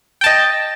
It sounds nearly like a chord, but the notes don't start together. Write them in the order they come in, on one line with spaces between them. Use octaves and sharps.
G5 A5 D#5